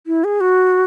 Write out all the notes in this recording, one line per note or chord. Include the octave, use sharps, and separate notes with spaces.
E4
G#4
F#4